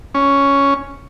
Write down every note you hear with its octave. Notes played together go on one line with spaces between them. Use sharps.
C#4